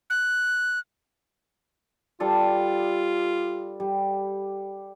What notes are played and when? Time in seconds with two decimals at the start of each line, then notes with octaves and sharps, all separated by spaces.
0.10 F#6
2.20 G3 F4 A4 D5
3.80 G3